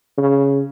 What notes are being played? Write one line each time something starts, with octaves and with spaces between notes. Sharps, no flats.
C#3